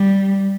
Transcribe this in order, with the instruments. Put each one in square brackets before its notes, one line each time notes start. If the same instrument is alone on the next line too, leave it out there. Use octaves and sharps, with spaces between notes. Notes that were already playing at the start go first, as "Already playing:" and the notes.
Already playing: [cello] G3